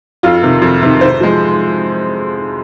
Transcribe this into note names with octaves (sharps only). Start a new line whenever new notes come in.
F2 F4
C3 D#3
F2
C3 D#3
G#2 C5
F3 G#3